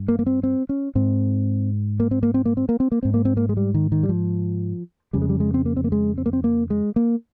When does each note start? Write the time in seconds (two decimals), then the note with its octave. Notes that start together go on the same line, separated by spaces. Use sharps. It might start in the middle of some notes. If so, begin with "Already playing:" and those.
Already playing: G2
0.08 A#3
0.19 A#3
0.26 C4
0.43 C4
0.69 C#4
0.95 G#2 C4
2.00 A#3
2.11 C4
2.23 A#3
2.34 C4
2.45 A#3
2.57 C4
2.69 A#3
2.80 C4
2.92 A#3
3.03 G#2 C4
3.14 A#3
3.25 C4
3.37 A#3
3.49 G#3
3.57 G3
3.74 D#3
3.92 D#3
4.03 G3
4.09 F3
5.13 F2 C#3 G3
5.22 G#3
5.29 G3
5.40 G#3
5.54 C4
5.66 A#3
5.77 C4
5.84 A#3
5.92 G#3
6.18 C4
6.26 A#3
6.33 C4
6.44 A#3
6.70 G#3
6.96 A#3